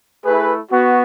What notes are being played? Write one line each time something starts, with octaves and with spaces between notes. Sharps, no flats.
A3 E4 G#4 B4
B3 F#4